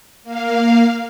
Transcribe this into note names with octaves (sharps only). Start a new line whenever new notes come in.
A#3 F5